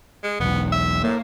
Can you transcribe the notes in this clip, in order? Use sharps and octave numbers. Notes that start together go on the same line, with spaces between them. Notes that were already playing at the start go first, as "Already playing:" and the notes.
G#3
E1 B1 B3
E5
A2 A#3